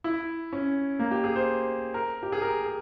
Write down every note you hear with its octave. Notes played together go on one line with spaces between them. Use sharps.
E4
C#4
A#3
G4
G#4
C5
A#4
G4
G#4
A#4
G#4